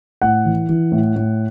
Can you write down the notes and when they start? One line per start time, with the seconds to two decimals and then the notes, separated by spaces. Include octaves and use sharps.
0.22 A2 F#5
0.45 E3
0.69 E3
0.92 A2
1.16 A2